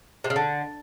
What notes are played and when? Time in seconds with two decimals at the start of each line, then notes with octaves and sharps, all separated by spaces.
0.24 C3
0.30 C#3
0.36 D3